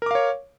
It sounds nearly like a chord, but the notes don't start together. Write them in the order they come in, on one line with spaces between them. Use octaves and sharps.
A#4 D6 F5 C#5